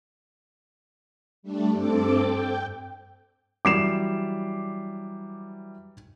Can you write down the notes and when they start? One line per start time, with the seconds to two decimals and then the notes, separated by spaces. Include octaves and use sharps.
1.43 G3 A3 D4
1.73 G2 C4 A4 D6
2.19 G5
3.65 E3 F#3 G3 D6 C7 E7